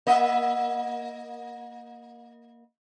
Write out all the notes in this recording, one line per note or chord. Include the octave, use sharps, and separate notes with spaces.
A#3 D#5 E5